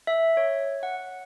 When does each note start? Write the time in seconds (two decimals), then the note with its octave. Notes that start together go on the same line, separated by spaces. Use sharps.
0.07 E5
0.37 C#5
0.83 F#5